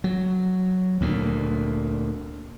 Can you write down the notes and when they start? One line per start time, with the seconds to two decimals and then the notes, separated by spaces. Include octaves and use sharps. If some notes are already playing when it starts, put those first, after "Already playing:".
0.04 F#3
1.01 D2 A#2